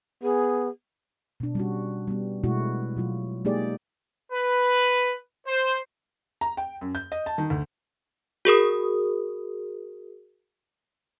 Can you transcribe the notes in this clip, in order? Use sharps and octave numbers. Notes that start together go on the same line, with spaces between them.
B3 G#4
B2 D4
G3 C#4 F#4
G3 B3
B2 G#3 A3 B3 E4 F#4
B2 F#3 F4
G#3 A#3 D#4 G4 G#4 D5
B4
C5
A#5
G5
F#2
G6
D#5
A5
D#3
D2
F#4 G#4 A#4 D#6